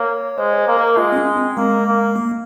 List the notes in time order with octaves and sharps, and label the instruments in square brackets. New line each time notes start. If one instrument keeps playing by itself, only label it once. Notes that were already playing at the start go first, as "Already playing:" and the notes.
Already playing: [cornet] A#3 [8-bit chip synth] C#5
[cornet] G#3 [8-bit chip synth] C5
[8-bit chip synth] C#5
C5
[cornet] A#3
[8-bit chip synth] A#4
[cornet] G#3 [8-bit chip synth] F4
[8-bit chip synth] C4
C#4
C4
[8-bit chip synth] G#3 [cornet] A#3
[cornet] A#3
[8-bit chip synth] A#3